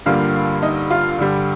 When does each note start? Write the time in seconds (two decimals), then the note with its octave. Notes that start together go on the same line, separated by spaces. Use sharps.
0.06 G2 D3 G3 A#3 F4 F5
0.62 D#4 D#5
0.90 F4 F5
1.19 G2 D3 G3